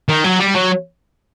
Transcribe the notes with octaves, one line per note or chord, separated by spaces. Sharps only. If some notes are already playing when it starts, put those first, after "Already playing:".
D#3
F#3
G3
F#3